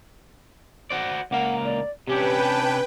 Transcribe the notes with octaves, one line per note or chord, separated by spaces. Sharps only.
F#4 C5 D5
C#2 A#3 F5 F#5
D5
C3 C#4 D4 G4 B4 G5
A5